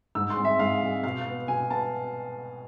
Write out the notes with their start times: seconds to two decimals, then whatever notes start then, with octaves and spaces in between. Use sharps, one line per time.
0.15 G#2 E6
0.30 C6
0.37 G#3 C4
0.45 E5
0.59 G#2 F5
0.82 G#3 C4
1.04 B2 F5
1.26 B3
1.48 B2 G#5
1.71 B3 A5